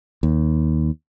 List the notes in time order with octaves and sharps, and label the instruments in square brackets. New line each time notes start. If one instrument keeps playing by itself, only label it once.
[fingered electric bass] D#2